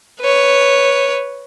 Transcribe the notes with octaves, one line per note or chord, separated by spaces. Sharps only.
B4 C#5